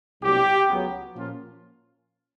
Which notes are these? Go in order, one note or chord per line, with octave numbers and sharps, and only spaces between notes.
C2 B2 F#3 A3 D4 G4
C#2 C#3 F#3 B3
A#2 F3 A#3 C#4 F4